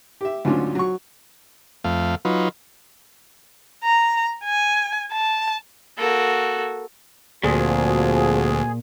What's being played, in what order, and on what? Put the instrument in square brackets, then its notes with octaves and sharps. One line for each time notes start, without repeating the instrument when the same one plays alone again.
[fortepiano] G4 E5
D2 G#2 F#3 C#4 D4 F4
F#3 C#6
[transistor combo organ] F2 A3 F5
F#3 D#4 F4 B4
[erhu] A#5
G#5
A5
[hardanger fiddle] A#3 F#4 [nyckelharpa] A4
[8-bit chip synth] D2 [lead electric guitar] A#2 [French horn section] F3 C4 F#4 [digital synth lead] G#4